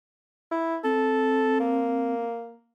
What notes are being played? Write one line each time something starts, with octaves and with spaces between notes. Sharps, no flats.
E4
C4 A4
A#3